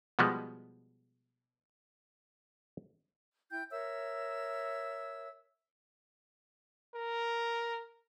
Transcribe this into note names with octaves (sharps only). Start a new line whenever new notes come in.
B2 F3 G3 G#3 B3
E4 G5 G6
A#4 C#5 E5 E6
A#4